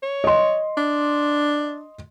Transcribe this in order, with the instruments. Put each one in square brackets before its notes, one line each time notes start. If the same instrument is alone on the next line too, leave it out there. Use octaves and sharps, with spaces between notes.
[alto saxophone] C#5
[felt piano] D#5 C6
[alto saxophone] D4